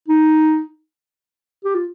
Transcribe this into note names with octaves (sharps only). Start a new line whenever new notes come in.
D#4
G4
F4